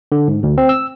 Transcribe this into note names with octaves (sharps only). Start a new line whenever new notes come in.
D3
G#2
D2
C4
E6